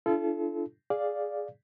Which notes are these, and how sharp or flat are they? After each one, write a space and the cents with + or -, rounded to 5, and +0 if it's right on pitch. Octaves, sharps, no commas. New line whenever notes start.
D4 +0 F4 -40 A4 -25
G#4 +0 D5 +0 F5 +0